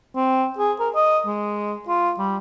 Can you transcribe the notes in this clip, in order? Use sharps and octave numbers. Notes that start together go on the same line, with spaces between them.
C4
G#4
A#4
D#5
G#3
F4
G3